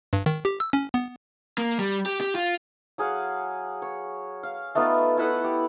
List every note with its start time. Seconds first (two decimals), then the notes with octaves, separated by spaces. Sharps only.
0.13 G2
0.26 D#3
0.45 G4
0.60 E6
0.73 C#4
0.94 B3
1.58 A#3
1.79 G3
2.06 G4
2.21 G4
2.35 F4
2.98 F#3 G#4 F5 F#5
3.82 C#5
4.43 F5
4.75 A3 B3 D#4 F4
5.17 E4 A4 B4 F#5
5.44 G4